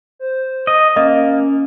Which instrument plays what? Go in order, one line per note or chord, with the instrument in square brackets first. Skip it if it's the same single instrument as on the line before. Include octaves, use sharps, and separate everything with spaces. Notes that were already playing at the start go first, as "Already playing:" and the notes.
[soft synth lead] C5
[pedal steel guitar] D#5
[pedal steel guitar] A#3 [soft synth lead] C#4 [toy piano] D#5